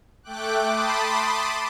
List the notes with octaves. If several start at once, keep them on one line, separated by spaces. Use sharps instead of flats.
A3 G5 D6 F#6
A5 B5 C6 D6 D#6